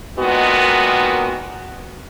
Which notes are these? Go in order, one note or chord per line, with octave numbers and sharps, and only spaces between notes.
A#2 D#3 G#3 B3 F#4